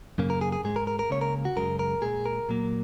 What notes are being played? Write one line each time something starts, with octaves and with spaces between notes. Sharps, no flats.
F#2 C#3 A#3
A#4
G#4
G#4
G#2 G#3 G#4
A#4
A#4
A#4
C#2 C#3 A#3 C#5
A#4
F#4
F#2 C#3 G#3 A#4
A#4
A#2 G#3 G#4
A#4
A#2 F#3 A#3